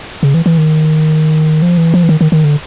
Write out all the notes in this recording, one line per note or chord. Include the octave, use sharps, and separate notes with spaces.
C#3
E3
E3
D#3
F3
E3
F3
E3
D#3
D#3
D#3
D3